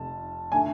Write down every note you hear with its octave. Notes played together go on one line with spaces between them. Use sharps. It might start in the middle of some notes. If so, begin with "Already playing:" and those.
Already playing: F1 A5
D3 A3 G#5